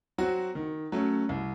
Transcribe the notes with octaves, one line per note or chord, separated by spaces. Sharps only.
F#3 C4 F#4
D#3
F#3 A3 C#4
C2